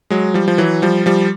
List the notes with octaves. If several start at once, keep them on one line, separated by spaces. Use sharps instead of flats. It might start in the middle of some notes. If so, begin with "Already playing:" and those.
F#3 G#3
F3 G3
F3
E3 F#3
F3 G3
F3 G3